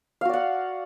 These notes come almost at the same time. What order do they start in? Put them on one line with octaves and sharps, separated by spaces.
F5 F#4 D5 F#5